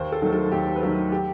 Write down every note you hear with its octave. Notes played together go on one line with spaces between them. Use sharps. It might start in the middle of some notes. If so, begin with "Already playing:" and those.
Already playing: D#2 C5
A4
D#3 F#3 A3
A4
D#2 G4
B4
D#3 F#3 A3 A4
G4